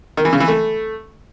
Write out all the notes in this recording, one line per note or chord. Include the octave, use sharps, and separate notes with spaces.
D#3
E3
C#3
E3
A3